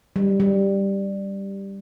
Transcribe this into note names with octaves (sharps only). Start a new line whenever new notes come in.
G3
G3